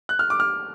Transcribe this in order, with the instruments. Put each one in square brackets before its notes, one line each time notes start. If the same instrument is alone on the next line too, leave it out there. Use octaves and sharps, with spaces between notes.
[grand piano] F#6
F6
D6
F6